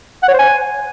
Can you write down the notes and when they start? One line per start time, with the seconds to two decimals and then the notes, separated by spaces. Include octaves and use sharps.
0.22 F#5
0.28 C#5
0.33 C5
0.39 G#5